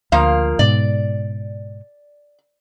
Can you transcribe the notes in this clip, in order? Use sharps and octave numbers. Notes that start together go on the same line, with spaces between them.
D2 F3 A#3 F5
G#2 B2 D5